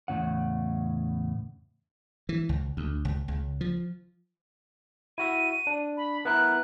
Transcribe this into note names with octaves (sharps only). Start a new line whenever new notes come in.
E2 A2 C#3 F#5
E3
C#2
D2
C#2
C#2
F3
E4 F#4 E5 D#7
D4
B5
B3 E4 A#4 F#6